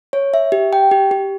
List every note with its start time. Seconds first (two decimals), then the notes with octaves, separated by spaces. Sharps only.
0.13 C#5
0.34 E5
0.52 G4
0.73 G5
0.91 G4
1.11 G4